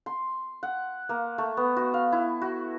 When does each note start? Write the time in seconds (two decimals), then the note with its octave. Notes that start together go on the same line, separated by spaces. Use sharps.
0.06 C6
0.63 F#5
1.09 A#3
1.38 A3
1.57 B3
1.77 F#4
1.94 F5
2.12 E4
2.42 F#4